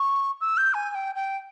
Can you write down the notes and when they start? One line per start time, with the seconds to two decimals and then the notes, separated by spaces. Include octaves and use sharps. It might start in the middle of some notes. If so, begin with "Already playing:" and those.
Already playing: C#6
0.41 E6
0.57 G6
0.74 G#5
0.90 G#5
0.95 G5
1.15 G5